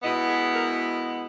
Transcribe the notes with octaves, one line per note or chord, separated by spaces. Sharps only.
B2 G#3 B3 E4 D#5
G#4
A#4